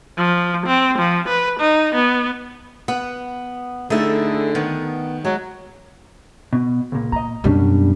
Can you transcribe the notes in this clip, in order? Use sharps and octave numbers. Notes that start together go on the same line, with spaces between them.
F3
C4
F3
B4
D#4
B3
B3 F#5
D3 A3 D#4 E4 G#4 A4 E5
D#3 B3
F#3 G#3
B2
C#2 A#2
A#2 D#5 A#5
F#2 B2 G3 C#4 D4